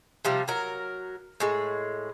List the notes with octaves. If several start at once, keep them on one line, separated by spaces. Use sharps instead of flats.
C3 F3 G3 E4
F#3 A#4
A2 G#3